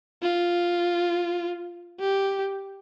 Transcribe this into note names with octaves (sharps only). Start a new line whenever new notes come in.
F4
G4